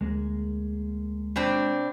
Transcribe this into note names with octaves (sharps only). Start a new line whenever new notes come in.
D2 G#3 A#3 G#4
B2 C4 D4